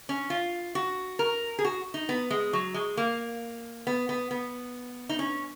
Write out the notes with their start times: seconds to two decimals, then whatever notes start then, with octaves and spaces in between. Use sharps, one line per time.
0.09 C#4
0.30 F4
0.75 F#4
1.19 A#4
1.59 G#4
1.65 F#4
1.94 D#4
2.09 B3
2.30 G#3
2.53 F#3
2.74 G#3
2.97 A#3
3.87 B3
4.09 B3
4.31 B3
5.09 D#4
5.19 C#4